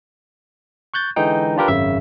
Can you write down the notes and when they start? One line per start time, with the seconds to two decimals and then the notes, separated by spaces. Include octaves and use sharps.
0.94 C#6 F#6 G6 A6
1.16 D3 E3 G#3 D#4 G5
1.56 D4 F4 G4 A#4 B4
1.68 G#1 F#2 C#3 E5